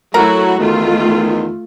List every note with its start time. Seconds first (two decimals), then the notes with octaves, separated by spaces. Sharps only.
0.14 F#3 A3 E4 F#4 A#4 A#5
0.59 E2 D#3 A3 F4